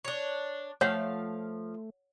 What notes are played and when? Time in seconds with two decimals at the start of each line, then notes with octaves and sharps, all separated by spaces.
0.05 D4 C#5
0.81 F3 A3 C#5 F5 F#5